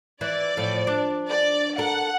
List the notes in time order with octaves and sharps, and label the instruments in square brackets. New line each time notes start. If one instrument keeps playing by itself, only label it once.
[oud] E3 [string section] D5
[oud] A2 F3
D4
[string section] D5
[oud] A4 A#4 [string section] F#5